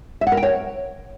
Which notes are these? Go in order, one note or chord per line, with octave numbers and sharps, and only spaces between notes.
E5
F#5
A#4
G5
C#5